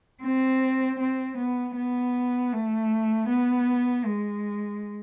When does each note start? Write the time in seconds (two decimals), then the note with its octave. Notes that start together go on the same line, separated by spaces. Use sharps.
0.23 C4
0.99 C4
1.38 B3
1.76 B3
2.52 A3
3.29 B3
4.05 G#3